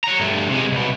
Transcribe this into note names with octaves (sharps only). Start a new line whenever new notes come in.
F#5 A#5
G2 A3
C3 G#3
C2 B2